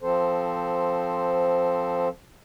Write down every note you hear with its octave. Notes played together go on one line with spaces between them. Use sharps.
F3 C4 A4 C5